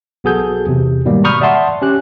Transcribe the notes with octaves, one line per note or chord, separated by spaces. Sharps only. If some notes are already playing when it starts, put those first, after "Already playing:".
B1 B3 F#4 G#4 A4 G6
E2 C3
G#2 B2 D#3 G3 A#3
A#5 B5 C#6 D#6 F6 G6
D5 E5 F#5 A5 C6
C#4 G4 F#6